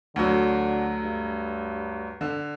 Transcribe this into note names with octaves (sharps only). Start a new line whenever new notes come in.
D2 D3 F#3
G2
D3